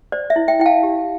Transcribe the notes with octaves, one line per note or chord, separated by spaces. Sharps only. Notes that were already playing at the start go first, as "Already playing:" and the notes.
C5 D5
E5
E4
E5 G5
E4 G5
F5 A5
G4